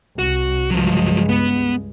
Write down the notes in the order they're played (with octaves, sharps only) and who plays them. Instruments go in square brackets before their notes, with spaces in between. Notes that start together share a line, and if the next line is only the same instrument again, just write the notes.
[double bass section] C2 [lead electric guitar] F#4
[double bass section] C#2 G2 G#3 [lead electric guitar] F3 F#3
[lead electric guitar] B3